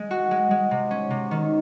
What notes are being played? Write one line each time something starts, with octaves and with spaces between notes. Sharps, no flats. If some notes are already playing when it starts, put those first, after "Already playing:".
Already playing: G#3
F#4
G#3
G#3
C3
C#4
C3
D#3